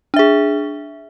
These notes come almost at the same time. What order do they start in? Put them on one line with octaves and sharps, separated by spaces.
D4 E5 G#4